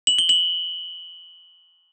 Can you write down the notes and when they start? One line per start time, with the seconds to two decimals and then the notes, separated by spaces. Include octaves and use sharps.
0.07 F#7
0.18 G7
0.29 F#7